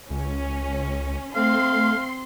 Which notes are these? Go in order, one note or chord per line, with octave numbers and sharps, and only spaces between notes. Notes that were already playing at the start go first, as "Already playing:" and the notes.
C#2 C#4
A3 C4 F5 C6